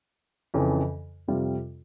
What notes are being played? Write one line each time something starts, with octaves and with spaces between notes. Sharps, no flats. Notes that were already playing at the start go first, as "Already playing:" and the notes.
F2 C#3 E3
F2 C3 G3 C4 F4